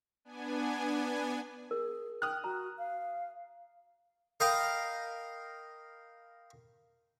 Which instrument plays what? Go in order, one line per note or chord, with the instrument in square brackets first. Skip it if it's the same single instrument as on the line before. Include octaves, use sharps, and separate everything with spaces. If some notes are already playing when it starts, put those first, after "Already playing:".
[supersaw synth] B3 D4 G#5
[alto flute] G#4 [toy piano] A#4
[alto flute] G5 [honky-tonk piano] D#6 F6 F#6
[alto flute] F#4 [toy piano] A#5
[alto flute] F5
[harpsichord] A#4 D#5 F5 G5 B5